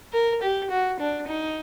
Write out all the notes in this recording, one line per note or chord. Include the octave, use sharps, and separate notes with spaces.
A#4
G4
F#4
D4
D#4